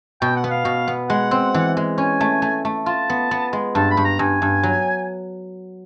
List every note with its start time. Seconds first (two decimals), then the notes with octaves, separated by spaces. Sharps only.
0.21 B2 G5
0.36 F#5
0.44 B3
0.50 F5
0.65 B2
0.88 B3
1.10 G#3 F#5
1.31 C4
1.54 E3
1.77 G#3
1.98 C#4 G#5
2.21 A3
2.42 A3
2.65 A3
2.86 F4 A5
3.10 B3
3.31 B3
3.53 G#3
3.75 G2 A5
3.91 B5
3.97 G2
4.05 A#5
4.19 G2 G#5
4.42 G2
4.63 F#3